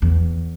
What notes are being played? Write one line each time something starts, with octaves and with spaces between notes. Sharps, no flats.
E2